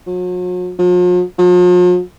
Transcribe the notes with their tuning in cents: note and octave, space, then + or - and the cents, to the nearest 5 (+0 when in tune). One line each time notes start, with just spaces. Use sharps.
F#3 -40
F3 +45
F3 +45